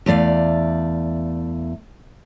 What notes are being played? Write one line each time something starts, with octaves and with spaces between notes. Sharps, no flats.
E2 A3 D5 F5